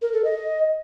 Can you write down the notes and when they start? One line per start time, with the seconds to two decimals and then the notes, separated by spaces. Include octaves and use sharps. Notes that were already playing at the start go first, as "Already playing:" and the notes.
0.02 A#4
0.13 A4
0.25 D#5